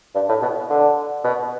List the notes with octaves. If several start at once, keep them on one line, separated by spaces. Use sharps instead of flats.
G2
A2
B2
D3
B2